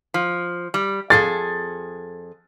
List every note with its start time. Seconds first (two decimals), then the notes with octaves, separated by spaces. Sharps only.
0.14 F3
0.74 G3
1.10 F2 G#4 A4 A6